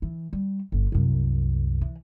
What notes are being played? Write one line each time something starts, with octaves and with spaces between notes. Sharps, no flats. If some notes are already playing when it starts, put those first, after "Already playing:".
E3
G3
G1
C2 F#2
E3